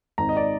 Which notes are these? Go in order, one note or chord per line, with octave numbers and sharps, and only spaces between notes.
G#1 A#5
D#5
D5